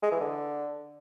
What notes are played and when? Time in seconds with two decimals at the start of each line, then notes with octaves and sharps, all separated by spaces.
0.03 G#3
0.12 E3
0.21 D3